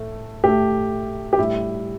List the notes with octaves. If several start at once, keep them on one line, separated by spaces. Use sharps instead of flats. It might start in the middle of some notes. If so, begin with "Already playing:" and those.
Already playing: A2 A3
A2 A3 G4
G4
A2 G3 E4